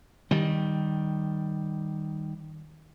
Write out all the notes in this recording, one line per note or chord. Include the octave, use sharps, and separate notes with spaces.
D#3 G3